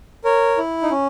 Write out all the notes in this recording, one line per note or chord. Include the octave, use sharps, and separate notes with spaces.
A#4 C#5
E4
D#4
C#4